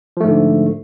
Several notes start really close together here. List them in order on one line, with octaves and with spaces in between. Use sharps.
F3 A3 G#2 D3